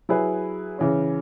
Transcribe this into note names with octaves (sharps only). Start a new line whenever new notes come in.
F#3 E4 G#4 B4
C#3 E3 C#4